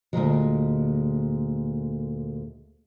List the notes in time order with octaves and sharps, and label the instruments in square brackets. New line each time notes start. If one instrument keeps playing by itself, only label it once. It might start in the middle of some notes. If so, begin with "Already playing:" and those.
[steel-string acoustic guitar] D2 G2 A#2 G#3